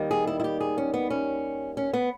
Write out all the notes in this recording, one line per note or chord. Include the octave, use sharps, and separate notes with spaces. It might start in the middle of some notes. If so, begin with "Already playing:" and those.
Already playing: D#2 D#3 G3
G#4
E4
E4
G4
G#4
C#4
B3
C#4
C#4
B3